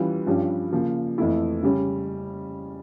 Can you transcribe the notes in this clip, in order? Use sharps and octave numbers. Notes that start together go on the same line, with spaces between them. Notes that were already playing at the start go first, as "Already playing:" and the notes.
Already playing: E3 G3 C#4 F4
G2 F3 C#4 G4
C#3 F3 A#3
F2 E3 A3 E4
C#3 G3 C#4